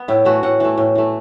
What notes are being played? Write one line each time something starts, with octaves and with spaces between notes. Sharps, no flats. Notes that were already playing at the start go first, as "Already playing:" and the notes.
Already playing: B3
A2 E4
E3 A3 F#4
A2 F#5
E3 A3
A2
E3 A3